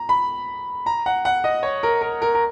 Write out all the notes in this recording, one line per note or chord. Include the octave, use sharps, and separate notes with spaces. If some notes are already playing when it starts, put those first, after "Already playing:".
Already playing: A#5
B5
A#5
F#5
F#5
D#5
C#5
A#4
A#4
A#4
A#4